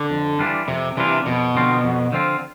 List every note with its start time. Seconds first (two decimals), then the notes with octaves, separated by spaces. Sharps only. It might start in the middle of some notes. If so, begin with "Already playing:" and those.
Already playing: D3
0.11 F2
0.39 E3 G3 D4 F4
0.68 F2 C3
0.97 C3 E3 G3 D4 F4
1.26 F2 B2
1.55 D3 F3 C4 F4
1.84 F2
2.12 D3 F3 C4 F4